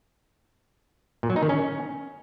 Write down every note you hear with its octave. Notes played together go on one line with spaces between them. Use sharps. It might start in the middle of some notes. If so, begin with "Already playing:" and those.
A#2
F#3
D#4
D#3
C#4